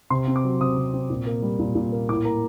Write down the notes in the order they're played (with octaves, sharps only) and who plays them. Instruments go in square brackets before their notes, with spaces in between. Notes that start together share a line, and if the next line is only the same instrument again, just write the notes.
[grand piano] C3 C6
C4
D6
F#3
C3 D#6
C3
C4
A#2
A#3
G3
A#2
A#2
A#3
A2 D6
A#3 A#5